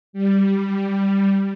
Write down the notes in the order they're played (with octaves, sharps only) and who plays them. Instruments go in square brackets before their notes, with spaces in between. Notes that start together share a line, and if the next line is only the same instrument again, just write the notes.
[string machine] G3